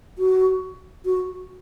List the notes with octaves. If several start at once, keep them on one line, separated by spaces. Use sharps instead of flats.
F#4
F#4